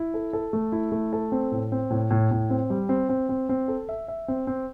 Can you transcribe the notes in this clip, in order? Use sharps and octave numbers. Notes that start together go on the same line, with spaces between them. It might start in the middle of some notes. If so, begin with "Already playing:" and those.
Already playing: E4
A4
A4
A3
E4
A3
A4
C4
A2
C4
A2
A2
A2
C4
G3
C4
C4
C4
C4
A4
E5
E5
C4
C4